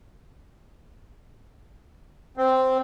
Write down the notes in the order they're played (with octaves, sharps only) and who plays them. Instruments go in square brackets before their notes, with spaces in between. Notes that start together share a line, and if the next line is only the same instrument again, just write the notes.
[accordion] C4